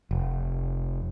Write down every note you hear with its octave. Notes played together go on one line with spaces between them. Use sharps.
F1